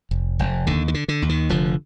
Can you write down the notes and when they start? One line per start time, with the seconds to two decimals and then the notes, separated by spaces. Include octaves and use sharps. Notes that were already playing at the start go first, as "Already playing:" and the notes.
0.11 F1
0.39 F1
0.67 D#2 D3
0.88 D#3
0.94 D3
1.08 D3
1.22 D#2
1.29 D#3
1.49 F1 D3 F3